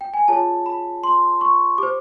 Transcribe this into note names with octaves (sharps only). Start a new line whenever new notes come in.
G5
G#5
F4 G#4 C#5 A5
B5
C6
C#6
G4 C5 D6